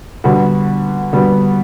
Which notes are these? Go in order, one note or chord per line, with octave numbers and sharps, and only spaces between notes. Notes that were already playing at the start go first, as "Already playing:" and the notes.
D3 G3 B3 F#4
D3 G3 B3 F#4